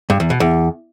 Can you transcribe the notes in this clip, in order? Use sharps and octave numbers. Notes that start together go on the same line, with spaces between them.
G2
E2
B2
E2